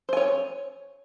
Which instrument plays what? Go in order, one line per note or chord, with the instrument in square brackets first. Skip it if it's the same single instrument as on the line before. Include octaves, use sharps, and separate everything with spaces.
[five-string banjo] C5
G#5
C#5